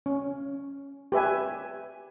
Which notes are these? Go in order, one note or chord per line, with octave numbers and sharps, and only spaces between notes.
C#4
G4 B4 E5 G#5